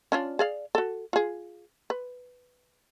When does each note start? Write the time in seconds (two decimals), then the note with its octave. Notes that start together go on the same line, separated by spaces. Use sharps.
0.12 C#4 D4 F4
0.39 G#4 D5 F5
0.75 F#4 A4
1.13 F4 G#4
1.90 B4